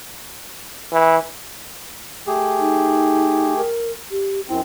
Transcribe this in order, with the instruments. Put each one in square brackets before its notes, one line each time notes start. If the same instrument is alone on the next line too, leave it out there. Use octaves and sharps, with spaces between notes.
[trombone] E3
[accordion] A3 G4 G#4
[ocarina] D#4
A#4
G4
[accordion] F#2 C4 [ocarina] E4